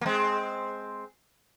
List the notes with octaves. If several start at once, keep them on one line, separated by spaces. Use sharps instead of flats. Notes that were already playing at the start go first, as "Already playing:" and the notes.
A#3
G#3 C4